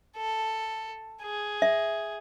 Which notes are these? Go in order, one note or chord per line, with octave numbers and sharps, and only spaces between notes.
A4
G#4
E5